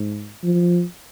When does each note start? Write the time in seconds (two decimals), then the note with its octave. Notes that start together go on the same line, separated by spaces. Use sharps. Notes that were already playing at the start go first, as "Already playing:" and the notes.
Already playing: G#2
0.43 F3